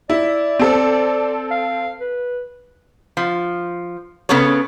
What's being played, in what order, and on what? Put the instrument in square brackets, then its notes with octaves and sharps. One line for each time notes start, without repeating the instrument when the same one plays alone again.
[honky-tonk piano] E4 [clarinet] D5
[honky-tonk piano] C4 A4
[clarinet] F5
B4
[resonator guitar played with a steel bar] F3
C#3 B3 C#4 A4 C#5